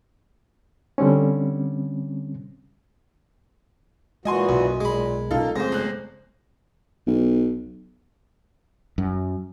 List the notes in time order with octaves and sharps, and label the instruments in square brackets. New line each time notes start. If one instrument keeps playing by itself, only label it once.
[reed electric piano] D3 G3 C4 C#4
[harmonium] A#2 E3 F#4 [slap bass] G#3 [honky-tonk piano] D#5 G#5 C6
[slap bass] B1 [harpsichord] F#2
[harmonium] A#2 [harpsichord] G#3 B5
[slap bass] B1 C#4 [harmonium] A#3 [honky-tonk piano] D#4 F4 A4
[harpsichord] F2 C#3 [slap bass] G#3 A3 C4 [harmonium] C5 [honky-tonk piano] A#6
[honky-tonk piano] G1 F#6
[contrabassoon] B1
[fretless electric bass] F#2